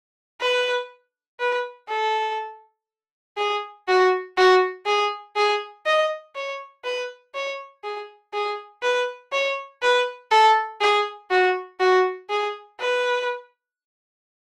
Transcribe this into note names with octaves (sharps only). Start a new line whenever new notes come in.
B4
B4
A4
G#4
F#4
F#4
G#4
G#4
D#5
C#5
B4
C#5
G#4
G#4
B4
C#5
B4
A4
G#4
F#4
F#4
G#4
B4